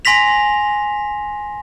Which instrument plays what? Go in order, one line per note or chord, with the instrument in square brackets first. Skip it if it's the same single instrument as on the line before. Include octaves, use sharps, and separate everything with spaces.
[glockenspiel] G#5 C6 A#6 B6 F7